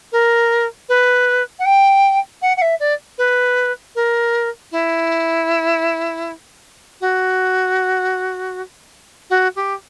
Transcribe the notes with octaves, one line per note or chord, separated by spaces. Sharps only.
A#4
B4
F#5
G5
F#5
F#5
E5
D5
B4
A#4
E4
F#4
F#4
G4